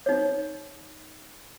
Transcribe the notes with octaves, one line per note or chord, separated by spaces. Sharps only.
D#4 C#5